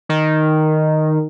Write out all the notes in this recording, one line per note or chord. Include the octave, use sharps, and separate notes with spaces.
D#3